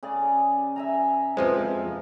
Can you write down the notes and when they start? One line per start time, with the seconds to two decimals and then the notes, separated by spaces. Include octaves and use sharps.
0.03 C#3 G#4 D5
0.76 E5 G#5 A#5
1.37 F2 F3 G#3 B4 C5